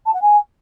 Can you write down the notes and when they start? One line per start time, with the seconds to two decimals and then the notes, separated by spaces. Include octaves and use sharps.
0.05 A5
0.13 F#5
0.22 G#5